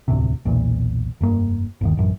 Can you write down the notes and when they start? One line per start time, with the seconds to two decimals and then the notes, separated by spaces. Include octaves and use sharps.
0.08 E1 D2 A2 C3
0.45 B1 E2 A#2
1.21 F1 G2 A#3
1.81 G1 D#2 D#3
1.97 A1 F#2